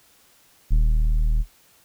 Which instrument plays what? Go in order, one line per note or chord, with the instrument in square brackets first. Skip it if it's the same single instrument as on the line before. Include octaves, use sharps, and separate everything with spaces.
[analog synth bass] D#1